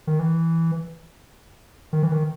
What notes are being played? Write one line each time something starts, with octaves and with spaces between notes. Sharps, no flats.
D#3
E3
D#3
E3
D#3